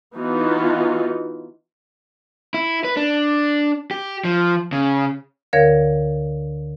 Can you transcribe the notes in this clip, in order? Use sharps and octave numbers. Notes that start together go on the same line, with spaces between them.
E3 B3 D#4 F4 F#4
E4
B4
D4
G4
F3
C#3
D2 D3 A#4 C#5 F5 G#6